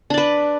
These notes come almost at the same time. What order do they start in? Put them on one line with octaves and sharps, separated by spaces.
D4 D5 B4